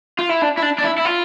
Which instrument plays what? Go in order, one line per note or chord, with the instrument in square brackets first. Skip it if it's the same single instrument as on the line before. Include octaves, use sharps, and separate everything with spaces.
[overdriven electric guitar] F4
E4
D4
E4
D4
D4
E4
E4
F4